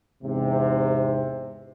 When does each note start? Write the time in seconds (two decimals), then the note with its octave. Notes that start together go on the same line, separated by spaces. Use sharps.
0.23 E2 G#2 C3